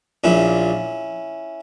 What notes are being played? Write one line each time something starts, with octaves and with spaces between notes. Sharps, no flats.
A#1 A#2 C#4 E4